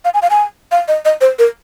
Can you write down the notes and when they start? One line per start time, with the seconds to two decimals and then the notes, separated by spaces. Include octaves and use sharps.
0.05 F5
0.14 G#5
0.22 F5
0.30 G#5
0.72 F5
0.88 D#5
1.05 D#5
1.21 C5
1.39 A#4